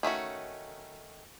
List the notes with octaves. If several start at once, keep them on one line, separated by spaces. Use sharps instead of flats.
D#3 A3 C#4 F#4